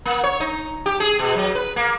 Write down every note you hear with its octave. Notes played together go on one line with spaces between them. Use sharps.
A#3
C#5
D#4
G4
G#4
B2
F#3
B4
A#3